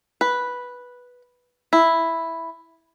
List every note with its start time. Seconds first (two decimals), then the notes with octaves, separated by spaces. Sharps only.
0.21 B4
1.73 E4